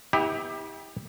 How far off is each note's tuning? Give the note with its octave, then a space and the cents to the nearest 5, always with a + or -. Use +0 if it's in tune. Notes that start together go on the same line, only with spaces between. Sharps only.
B3 +0 E4 -40 G4 +20